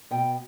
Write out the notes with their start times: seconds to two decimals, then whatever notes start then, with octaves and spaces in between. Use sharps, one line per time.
0.11 B2 G5